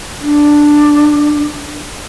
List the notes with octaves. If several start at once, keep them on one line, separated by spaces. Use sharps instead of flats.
D4